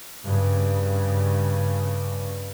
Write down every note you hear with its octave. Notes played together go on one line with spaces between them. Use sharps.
G2 C#3